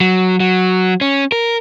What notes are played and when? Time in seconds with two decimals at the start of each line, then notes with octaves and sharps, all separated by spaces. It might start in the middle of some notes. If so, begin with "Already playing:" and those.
0.01 F#3
0.40 F#3
1.01 C#4
1.32 A#4